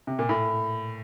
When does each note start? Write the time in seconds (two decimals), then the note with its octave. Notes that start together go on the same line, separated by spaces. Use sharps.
0.07 C3
0.19 A#2
0.29 A2